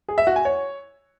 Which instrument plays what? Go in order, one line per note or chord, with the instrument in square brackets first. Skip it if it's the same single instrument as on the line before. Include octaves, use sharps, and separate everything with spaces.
[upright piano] G#4
E5
F#4
G#5
C#5